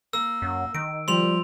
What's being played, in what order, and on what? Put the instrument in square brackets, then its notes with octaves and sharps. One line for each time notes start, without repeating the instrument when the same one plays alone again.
[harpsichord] A#3 [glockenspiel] E6
[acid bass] F#2
[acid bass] D#3 [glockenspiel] D7
[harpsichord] F3 [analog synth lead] G3 [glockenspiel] C6 F7